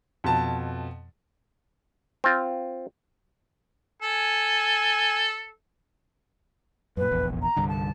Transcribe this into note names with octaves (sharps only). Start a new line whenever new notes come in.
F2 B2 A5
C4 F4
A4 G#5
F#2 A#2 B4
F1 A#1 E2
A#5
C2 G2 D3
A5